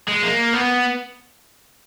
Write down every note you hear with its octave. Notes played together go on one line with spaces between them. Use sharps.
G#3
A#3
B3